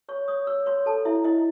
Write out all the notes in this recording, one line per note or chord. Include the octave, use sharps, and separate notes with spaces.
C#5 C#6
C#5 D#6
C#5 E6
C#5 C6
A4 A5
E4 E5
E4 D#5